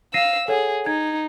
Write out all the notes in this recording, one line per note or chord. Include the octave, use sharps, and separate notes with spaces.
F5 E6 A#6 C7 D#7
G#4 A4 C#5 F#5
D#4 G#6